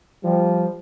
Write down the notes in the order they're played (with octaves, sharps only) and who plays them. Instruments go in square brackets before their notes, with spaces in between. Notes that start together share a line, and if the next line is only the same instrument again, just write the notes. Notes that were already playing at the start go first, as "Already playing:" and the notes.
[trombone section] F3 G3